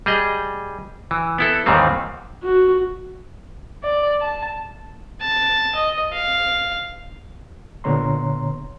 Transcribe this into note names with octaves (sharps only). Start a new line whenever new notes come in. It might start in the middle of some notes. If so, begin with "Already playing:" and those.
G3 G#4 D#5
E3
B3 E4 A4
D#2 G#2 D#3 E3 G3 C4
F#4
D5
A5
A5
D#5
F5
A#2 D3 B3 C#5 A#5 C6